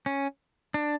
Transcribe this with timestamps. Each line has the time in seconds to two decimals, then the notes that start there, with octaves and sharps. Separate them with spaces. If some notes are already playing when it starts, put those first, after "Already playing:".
0.06 C#4
0.74 D4